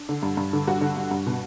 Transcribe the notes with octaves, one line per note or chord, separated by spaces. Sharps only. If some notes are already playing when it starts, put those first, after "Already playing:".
Already playing: D4
D3
G2
G2
D3
G2 F#4
D3
G2
G2
B2